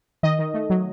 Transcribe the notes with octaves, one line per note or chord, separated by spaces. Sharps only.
D#3 D#5
D#3
A3
F#3